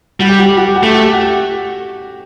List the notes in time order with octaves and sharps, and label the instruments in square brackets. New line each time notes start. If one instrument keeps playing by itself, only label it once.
[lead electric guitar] G3 [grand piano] F#4
[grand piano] G4
F#4
G4
F#4
G4
F#4
[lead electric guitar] A3 [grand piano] G4
[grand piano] F#4
G4
F#4